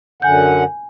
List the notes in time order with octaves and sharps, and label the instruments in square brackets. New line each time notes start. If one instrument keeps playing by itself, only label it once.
[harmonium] F#2 D3 F#5 [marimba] G#5 G6